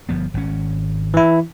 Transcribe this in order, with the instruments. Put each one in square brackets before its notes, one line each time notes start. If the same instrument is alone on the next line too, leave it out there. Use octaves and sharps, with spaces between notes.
[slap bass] G1 F3 B3
G#1 C#4
[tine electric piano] E3 E4